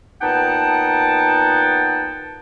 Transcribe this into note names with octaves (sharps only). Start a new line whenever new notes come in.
A#2 B3 D#4 F#5 G5 A5